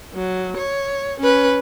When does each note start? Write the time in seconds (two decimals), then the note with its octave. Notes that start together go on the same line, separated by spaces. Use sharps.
0.14 F#3
0.56 C#5
1.20 C#4 B4